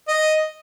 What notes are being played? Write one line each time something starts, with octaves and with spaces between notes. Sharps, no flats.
D#5